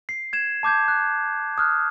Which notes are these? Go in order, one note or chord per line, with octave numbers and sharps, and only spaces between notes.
C7
G#6 E7
A5 D6 G6 G#6
F#6
D#6 F6 F#6